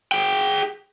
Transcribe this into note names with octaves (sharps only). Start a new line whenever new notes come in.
G#4 G5